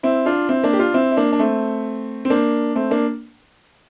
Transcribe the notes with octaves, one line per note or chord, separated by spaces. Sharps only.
C4 E4
D4 F4
C4 E4
A#3 D4
G4
D4 F4
C4 E4
E4
A#3 D4
D4
A3 C4
C4
A#3 D4
A3 C4
A#3 D4